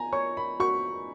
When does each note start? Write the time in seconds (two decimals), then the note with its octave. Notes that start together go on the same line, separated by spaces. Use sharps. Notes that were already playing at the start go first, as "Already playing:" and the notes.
Already playing: G#5 A#5
0.13 C#5 C#6
0.37 B5
0.60 F#4 C#6